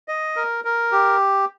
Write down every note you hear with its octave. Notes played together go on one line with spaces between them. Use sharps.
D#5
A#4
A#4
G4